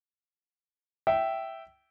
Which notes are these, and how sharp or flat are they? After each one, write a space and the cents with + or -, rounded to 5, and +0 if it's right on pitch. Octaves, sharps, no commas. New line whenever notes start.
E5 +0 G5 -15